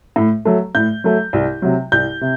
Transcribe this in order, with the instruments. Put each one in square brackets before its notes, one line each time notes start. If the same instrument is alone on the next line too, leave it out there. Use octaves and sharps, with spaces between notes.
[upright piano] A2
F#3 A3
A2 G6
F#3 A3
C2
C3 F#3
C2 G6
C3